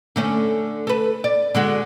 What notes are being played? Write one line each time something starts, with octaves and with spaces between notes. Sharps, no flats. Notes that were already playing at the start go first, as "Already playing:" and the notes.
D3 A3 C#4
A4 B4
D5
D3 G#3 F#4